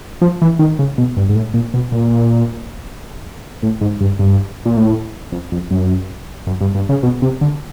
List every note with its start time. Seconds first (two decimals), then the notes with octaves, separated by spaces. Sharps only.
0.22 F3
0.42 E3
0.59 D#3
0.79 C#3
0.98 B2
1.17 G2
1.29 G#2
1.35 A2
1.54 A#2
1.74 B2
1.92 A#2
3.63 A2
3.81 G#2
4.01 G2
4.19 G2
4.66 A#2
4.77 A2
5.32 F2
5.52 F2
5.71 F#2
6.47 F#2
6.61 G2
6.75 G2
6.89 C#3
7.03 B2
7.22 C3
7.41 D3